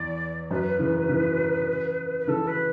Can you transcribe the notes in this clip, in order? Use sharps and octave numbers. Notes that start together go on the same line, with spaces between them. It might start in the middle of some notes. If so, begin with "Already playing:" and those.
Already playing: E2 D5
F#2 B4
C#3 E3
C#3 E3
B4
C#3 E3 A4
B4